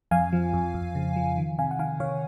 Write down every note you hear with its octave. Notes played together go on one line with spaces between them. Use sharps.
F2 F5 G#5
F3
F2
F2
C#3
F3
D#3
C3 F5 G#5
F#5
D#3 F5 G#5
D#3 C#5 F5